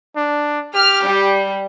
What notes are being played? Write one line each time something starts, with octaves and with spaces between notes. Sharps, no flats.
D4
G4 F6
G3